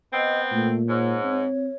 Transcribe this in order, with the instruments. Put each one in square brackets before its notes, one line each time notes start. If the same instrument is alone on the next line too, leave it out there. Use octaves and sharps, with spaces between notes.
[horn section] B3 C4 [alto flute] D#5
[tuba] A#2 [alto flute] A3
[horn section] G#2 [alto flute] C#5
[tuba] C4